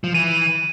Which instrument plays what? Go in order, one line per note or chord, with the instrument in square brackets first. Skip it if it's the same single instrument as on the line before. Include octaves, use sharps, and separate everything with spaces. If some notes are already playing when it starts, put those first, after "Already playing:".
[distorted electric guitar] F3
[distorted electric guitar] E3 [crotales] D#7